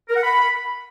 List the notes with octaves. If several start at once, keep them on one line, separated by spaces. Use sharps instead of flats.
A#4
F#5
B5